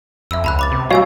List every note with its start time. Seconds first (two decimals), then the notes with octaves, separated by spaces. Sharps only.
0.31 F2 E5 B5 E6
0.44 C#2 A5 B5 F#6
0.59 B5 D6 A6
0.71 C3
0.91 G3 F#4 C#5 D#5 F5 G#5 E6